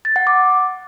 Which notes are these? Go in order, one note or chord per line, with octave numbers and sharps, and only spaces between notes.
A6
F#5
D6